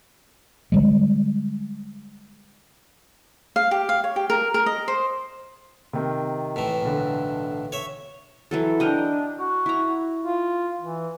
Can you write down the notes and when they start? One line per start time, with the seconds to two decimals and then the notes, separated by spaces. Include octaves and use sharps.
0.72 D3 G3 G#3
3.56 F5
3.71 G4
3.89 F5
4.04 C#5
4.16 G4
4.30 A#4
4.54 A#4
4.66 D#5
4.88 C5
5.93 C3 D#3
6.56 A2 E3
6.82 B1 D3
7.72 C#5 E5
8.51 E3 F#3 A4
8.80 D4 A#4 D#5 G5
9.39 F#4
9.66 E4 A#5
10.24 F4
10.81 E3